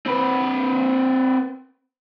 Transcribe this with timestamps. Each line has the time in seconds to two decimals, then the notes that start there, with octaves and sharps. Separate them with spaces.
0.06 C4 B4